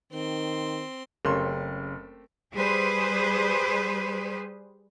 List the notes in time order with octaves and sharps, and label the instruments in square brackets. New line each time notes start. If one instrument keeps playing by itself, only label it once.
[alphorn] D#3 [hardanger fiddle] C4 C6
[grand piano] F#1 C6 [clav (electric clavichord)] C#3 [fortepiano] A3 C4 G4 [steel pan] A#4 C#6
[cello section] G3 G#4 B4 C5